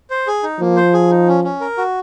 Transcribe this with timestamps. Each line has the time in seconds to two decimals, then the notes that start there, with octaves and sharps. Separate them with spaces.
0.10 C5
0.27 G#4
0.43 D#4
0.60 F3 A#3
0.76 C5
0.93 G#4
1.11 D#4
1.28 C#4
1.44 C#4
1.61 A#4
1.77 F#4